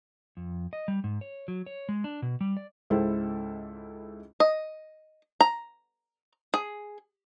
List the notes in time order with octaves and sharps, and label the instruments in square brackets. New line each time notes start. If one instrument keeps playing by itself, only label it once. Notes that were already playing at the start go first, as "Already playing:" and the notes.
[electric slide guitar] F2
D#5
G3
G#2
C#5
F#3
C#5
G#3
D4
B2
G3
D5
[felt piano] C#2 G#2 E4 A4 C5
[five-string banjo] D#5
A#5
G#4